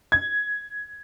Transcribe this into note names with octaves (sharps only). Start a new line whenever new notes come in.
G#6